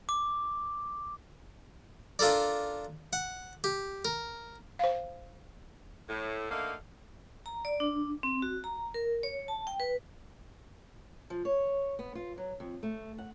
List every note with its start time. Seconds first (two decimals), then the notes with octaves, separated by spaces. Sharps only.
0.09 D6
2.19 D4 F4 A4 A#4 D5
3.13 F#5
3.64 G4
4.05 A#4
4.79 C5 F5
6.09 A2
6.51 D3 A3 A#3 D#4 F5
7.46 A#5
7.65 D5
7.80 D4
8.23 C4
8.42 F#4
8.64 A#5
8.94 A#4
9.23 C#5
9.48 A5
9.67 G5
9.80 B4
11.30 F3
11.45 C#5
11.99 B3
12.15 F4
12.38 F#3
12.60 F2
12.83 A3
13.18 F#5